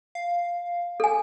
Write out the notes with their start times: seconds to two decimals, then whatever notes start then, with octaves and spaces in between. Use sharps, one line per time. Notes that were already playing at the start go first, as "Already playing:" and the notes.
0.15 F5
1.00 A4 G#5